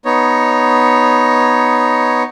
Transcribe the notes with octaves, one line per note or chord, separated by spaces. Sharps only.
B3 D#4 C#5